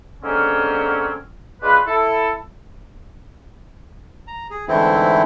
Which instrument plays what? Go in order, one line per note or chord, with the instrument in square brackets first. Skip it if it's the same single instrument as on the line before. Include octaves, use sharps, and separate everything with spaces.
[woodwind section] D3 G#3 A#3 C4 C#4
C#3 G#3 D4 F4 B4
E4 A4
[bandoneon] A#5
G#4
G#2 D3 E3 A3 C4 E4